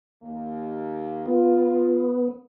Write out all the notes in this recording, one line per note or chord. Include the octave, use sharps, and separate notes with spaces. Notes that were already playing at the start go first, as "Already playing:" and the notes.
D#2 A#3
B3 F4